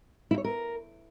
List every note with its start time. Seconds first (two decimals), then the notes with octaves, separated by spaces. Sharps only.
0.31 E4
0.38 C#5
0.44 A#4